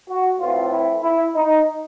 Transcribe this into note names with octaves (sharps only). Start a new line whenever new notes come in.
F#4
A2 E3 A3 C4 F4
E4
E4
D#4